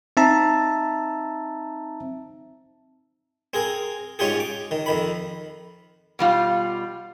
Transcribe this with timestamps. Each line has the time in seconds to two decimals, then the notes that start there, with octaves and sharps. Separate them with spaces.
0.17 C4 D#4 E5 A5 A#5
3.53 C4 G#4 A#4
4.19 G#2 C#4 F4 G4 G#4
4.40 D6
4.71 D#3
4.86 F2 D#3 B5
6.19 B2 G3 F4